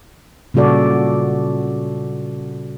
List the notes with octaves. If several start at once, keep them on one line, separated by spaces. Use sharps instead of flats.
A#2 C#3 G3 F#4 A4 D5